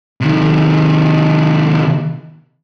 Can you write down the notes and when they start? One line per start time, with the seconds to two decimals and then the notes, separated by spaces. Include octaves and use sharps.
0.21 C3 D#3